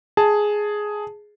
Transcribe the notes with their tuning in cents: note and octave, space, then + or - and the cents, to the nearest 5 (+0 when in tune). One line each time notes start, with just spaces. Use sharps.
G#4 +5 A5 +0